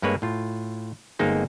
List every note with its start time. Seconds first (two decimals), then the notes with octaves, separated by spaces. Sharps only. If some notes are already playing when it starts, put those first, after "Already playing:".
0.02 G2 G#3 A#3 B4 C#5
0.22 A2 F4
1.19 G1 G#3 A#3 C4 D#4 G#4